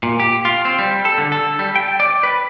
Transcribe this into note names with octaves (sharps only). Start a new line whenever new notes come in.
A#2
G4
F4
C4
G3
A4
D3
A4
G3
G5
D5
B4